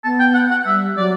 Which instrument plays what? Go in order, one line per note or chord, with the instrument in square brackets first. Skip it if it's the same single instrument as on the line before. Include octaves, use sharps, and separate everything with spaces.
[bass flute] B3 [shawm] A5
[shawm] G5
F#5
F#5
[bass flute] G3 [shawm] E5
[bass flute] F#3 [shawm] D5